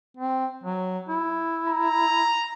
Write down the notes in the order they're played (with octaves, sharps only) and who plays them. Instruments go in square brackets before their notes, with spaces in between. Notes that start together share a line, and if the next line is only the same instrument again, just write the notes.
[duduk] C4
F#3
E4
[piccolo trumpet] A#5